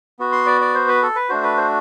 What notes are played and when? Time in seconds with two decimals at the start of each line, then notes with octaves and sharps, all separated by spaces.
0.19 B3 F#4
0.32 C6
0.46 D5
0.61 D5
0.75 C5
0.88 B4
1.02 A4
1.16 B4
1.29 A3 D4 F#4 C5
1.43 B4
1.57 C5